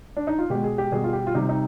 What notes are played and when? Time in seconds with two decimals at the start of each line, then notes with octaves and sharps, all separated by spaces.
0.17 D4
0.27 D#4
0.38 F4
0.50 B2 G#3 G4
0.64 G#4
0.78 G4
0.92 B2 G3 G#4
1.04 F4
1.13 G4
1.27 F4
1.34 C3 G3 D#4
1.49 D#4